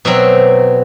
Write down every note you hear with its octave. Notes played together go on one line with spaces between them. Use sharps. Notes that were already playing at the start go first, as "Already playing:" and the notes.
B2 F#3 C4 E5